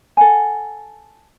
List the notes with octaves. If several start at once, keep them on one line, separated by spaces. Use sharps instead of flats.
A4 F#5 G#5